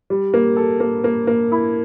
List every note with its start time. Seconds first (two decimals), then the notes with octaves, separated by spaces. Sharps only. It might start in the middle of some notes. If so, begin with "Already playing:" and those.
0.10 G3
0.34 A#3
0.57 A4
0.80 A#3
1.04 A#3
1.27 A#3
1.52 E4